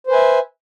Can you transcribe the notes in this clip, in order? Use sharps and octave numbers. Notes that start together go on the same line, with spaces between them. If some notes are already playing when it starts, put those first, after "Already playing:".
B4 C5 E5 G#5